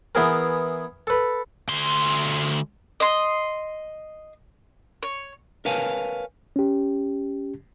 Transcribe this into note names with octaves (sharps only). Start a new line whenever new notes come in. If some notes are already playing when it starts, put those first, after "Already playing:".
E3 B3 G#4 A#4
A4 B4
D2 C6
D#5 C6
C#5
A#4 B4 C#5 F5 G#5 A5
C#4 G4